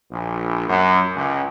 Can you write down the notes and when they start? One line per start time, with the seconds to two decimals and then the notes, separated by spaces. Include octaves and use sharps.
0.10 A#1
0.67 F#2
1.15 C#2